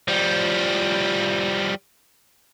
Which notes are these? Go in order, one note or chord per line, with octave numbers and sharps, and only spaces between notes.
F3 G3